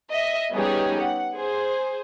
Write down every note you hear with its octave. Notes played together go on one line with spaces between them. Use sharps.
D#5 E5
G3 B3 C#4 D#4 G4 G#4
F#5
G#4 C5